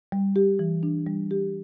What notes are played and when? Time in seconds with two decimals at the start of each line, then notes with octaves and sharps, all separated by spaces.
0.12 G3
0.36 G4
0.59 E3
0.83 D4
1.07 G3
1.31 G4